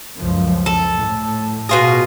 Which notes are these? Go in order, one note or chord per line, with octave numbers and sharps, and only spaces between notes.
C#2 F#2 F3
A4
A2
B2 F4 G#4